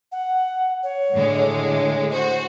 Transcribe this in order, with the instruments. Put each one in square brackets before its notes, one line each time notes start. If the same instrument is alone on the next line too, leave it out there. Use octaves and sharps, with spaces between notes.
[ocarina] F#5
C#5
[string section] A2 D3 G#3
[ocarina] C#5
[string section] F#4 [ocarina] C5